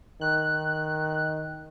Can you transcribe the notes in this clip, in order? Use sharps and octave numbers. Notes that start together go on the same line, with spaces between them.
D#3 F#6